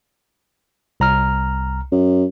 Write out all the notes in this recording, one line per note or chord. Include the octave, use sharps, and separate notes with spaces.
C2 A#5 F6
F#2